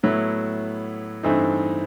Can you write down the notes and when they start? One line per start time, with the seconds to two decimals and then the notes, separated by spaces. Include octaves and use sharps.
0.03 A2 F#3 B3 E4
1.23 G2 E3 A3 C4 D#4